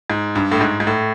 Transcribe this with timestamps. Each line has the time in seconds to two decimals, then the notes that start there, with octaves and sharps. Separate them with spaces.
0.10 G#2
0.35 G2
0.52 A2
0.61 G#2
0.80 G#2
0.87 A2